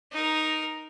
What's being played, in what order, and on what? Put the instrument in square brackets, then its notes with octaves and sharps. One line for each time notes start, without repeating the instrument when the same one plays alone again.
[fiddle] D#4 A#4